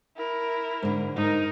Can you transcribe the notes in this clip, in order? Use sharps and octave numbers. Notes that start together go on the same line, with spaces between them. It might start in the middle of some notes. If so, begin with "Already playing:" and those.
E4 A#4
G#2 D3
G#2 D#4 A#4